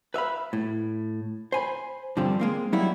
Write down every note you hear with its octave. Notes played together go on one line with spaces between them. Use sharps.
B4 E5 F5 B5
A2
C5 G#5 B5
G2 D3 F3 G3 C4
G#3 A#3 C4
F#3 G3 A#3 D#4 E4